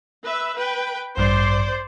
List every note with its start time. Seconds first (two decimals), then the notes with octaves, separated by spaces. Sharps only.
0.25 B4 E5
0.57 B4 G5
1.17 A1 G2 C5 D5